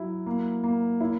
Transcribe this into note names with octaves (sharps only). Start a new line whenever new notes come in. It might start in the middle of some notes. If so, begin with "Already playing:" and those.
Already playing: F#3 E4
A#3
A#3
E4